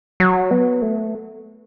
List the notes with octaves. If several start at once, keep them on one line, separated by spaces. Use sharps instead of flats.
F#3
B3
A3